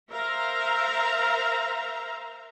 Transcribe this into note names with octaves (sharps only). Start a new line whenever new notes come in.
A#4 C5 E5 F5 A#5